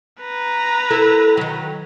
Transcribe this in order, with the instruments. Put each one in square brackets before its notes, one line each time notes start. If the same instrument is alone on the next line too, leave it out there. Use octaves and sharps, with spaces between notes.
[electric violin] B4 A#5
[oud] E4 A4 A#4
D#3 F#3